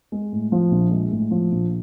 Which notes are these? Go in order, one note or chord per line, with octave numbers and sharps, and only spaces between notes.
G#3
A2
F3
A#1
G#3
A2
F3
A#1